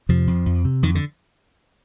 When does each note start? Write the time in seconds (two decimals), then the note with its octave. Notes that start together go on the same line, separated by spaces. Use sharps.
0.09 F2 C3 F3
0.27 F2
0.46 F2
0.65 C3
0.83 F2 D#3
0.95 D3